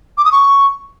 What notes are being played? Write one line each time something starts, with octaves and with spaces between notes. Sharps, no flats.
D6
D#6
C#6